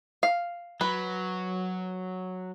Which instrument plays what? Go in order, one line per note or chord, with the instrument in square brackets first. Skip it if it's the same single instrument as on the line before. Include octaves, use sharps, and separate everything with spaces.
[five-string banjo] F5
[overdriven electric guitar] F#3 [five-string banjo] B4